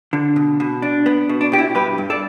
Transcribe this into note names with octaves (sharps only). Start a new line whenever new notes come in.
D3
B2
B2
D4
B3
B2
D4
B2 G4
E4
G2 G4 B4
G2
A4 D5